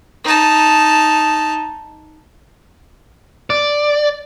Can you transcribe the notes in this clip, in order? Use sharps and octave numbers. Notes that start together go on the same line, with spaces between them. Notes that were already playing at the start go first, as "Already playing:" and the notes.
D#4 A5
D5